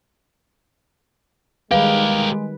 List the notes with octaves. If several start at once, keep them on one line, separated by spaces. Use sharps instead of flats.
D#3 G3 G#3 G4 A#4 B4 F5